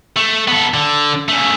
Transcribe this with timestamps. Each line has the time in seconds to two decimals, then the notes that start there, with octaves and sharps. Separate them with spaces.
0.16 A3
0.48 B3 A4
0.74 D3
1.28 C#3 A3